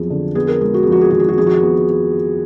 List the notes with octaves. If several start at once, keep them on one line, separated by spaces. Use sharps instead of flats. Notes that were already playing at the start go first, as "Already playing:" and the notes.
Already playing: F2 F#3 B3 G#4
D3
B3 G#4
A#4
G#3 G#4
F#4
F2 G#4
F#4
G#4
D#3 F#4
G#4
F#4
F2 G#4
F#4
B3